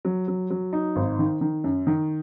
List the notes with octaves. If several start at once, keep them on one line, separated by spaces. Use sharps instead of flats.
F#3
F#3
F#3
D#4
G#1
D#3
D#3
F#2
D#3